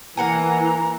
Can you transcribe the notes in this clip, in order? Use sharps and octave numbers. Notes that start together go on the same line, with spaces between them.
E3 A#3 F#5 G#5 A#5